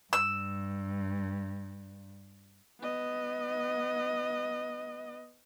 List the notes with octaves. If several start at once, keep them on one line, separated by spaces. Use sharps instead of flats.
G2 E6
B3 D#5